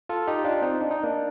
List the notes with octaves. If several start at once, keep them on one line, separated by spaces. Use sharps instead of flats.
F4 A4
D#4 G4
D4 F4
C4 D#4
D4
D#4
A#3 D4